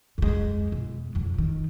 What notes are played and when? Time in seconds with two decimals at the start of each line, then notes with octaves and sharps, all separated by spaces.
0.18 F2 G#3
0.72 B2
1.15 F2 C#3
1.38 D#3